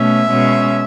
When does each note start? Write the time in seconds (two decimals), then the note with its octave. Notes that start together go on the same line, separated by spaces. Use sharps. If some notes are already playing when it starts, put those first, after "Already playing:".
Already playing: B2 A3 C#4 E5
0.30 B2 G#3 C#4